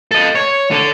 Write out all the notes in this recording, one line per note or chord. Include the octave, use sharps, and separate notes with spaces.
A4 D#5
C#5
D3 A4